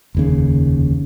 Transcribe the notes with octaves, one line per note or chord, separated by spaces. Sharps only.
F1 D#2 C#3